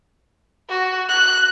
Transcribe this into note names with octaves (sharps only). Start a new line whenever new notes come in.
F#4
F#6